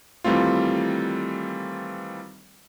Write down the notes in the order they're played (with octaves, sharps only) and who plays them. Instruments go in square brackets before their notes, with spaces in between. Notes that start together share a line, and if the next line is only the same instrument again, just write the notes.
[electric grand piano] D#3 E3 G3 A3 C4 F4